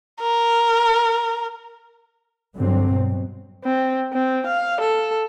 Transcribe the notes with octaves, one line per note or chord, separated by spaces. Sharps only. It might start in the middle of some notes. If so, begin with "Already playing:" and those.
A#4
G2 D3 F#3 C4
B2
C4
C4
F5
A4